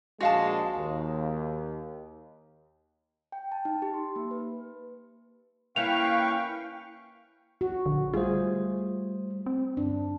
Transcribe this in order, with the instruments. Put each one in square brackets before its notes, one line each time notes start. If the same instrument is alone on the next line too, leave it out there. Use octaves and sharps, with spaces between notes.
[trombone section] A#1 G#3 [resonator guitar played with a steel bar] F#4 F5 A5
[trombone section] D#2
[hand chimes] G5
A5
D#4
G4
C6
A#3
B4
[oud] A#3 E4 [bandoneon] C#4 B4 [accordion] F5 G5 C#6 [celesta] F7
[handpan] F#4
[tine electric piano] A#1 [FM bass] D3
[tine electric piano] G3 A3 C5 [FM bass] F4 [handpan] G#4
[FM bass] C4
[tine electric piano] G2 [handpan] D4